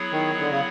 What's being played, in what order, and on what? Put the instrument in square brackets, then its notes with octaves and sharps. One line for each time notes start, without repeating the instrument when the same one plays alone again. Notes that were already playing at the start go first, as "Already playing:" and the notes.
Already playing: [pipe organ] F#3 B3 E4 G#4 C#5
[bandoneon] D#3
D3
C#3